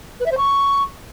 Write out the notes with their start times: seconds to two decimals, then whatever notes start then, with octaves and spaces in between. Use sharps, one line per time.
0.20 B4
0.26 E5
0.32 C5
0.37 C#6